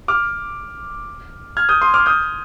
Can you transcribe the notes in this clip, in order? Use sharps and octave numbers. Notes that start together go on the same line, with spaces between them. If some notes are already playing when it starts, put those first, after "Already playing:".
D6 F6
F6 G#6
D#6 G6
C6 D#6
D6 F6
D#6 G6